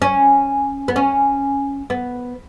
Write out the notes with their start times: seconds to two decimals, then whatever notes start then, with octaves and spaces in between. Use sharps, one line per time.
0.02 C#4
0.88 B3
0.96 C#4
1.90 B3